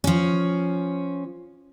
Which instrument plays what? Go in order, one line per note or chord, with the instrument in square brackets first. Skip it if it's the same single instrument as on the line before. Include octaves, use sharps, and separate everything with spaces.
[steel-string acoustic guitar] F3 C#4